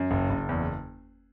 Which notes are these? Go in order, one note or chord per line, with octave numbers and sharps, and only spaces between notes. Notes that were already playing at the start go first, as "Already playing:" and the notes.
Already playing: F#2
F#1
F#1
E2